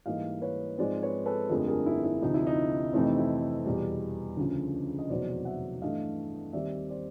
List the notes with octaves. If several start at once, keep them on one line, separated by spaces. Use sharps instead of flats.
G#2 E3 G3 A#3 D#5 F5
B4 C#5
G#2 F3 G#3 C4 C5 D5
B4 C#5
A4 B4
G1 F2 D3 F3 A3 G#4 A#4
G#4 A#4
E4
E4
D2 C3 F3 D#4
E4
D#4
F2 C3 E3 A3 C4 D#4
D#4
E4
E2 B2 G3
D2 C#3 F3
D#5
F1 E2 B2 F#3 B3 C5 D5
E5 F#5
G2 E3 A3 D4 D#5 F5
D#2 D#3 G3 C4 D5 E5
C5 D5